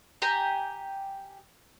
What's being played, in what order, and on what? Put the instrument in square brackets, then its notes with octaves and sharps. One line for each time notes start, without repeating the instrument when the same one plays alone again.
[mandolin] G4 G#5 A#5